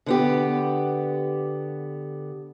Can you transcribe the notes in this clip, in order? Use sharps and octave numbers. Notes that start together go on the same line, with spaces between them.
D3 B3 G4